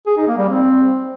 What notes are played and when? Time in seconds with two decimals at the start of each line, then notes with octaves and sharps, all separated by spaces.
0.06 G#4
0.17 D#4
0.27 A#3
0.38 G3
0.48 C4